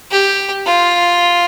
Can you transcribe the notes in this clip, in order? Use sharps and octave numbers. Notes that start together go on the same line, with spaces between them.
G4
F4